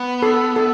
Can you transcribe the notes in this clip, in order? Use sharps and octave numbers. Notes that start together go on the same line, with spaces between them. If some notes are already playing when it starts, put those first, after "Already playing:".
Already playing: B3
A4
A4